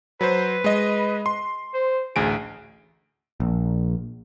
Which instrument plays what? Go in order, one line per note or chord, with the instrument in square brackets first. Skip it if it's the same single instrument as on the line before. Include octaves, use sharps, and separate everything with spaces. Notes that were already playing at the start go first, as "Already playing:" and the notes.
[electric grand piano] F#3 C5 [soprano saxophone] B4
[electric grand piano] G#3 D#5
C6
[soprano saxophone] C5
[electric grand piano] A1 D2 D7 [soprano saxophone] G#4
[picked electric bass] A#1